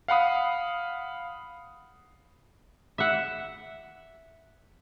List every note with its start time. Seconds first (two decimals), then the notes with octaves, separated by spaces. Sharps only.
0.08 F5 F#5 B5 D#6
2.98 E5 F#5